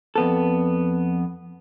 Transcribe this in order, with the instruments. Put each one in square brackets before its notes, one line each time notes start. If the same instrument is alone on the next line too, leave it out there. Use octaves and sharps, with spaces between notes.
[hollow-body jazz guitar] F2 B3 A4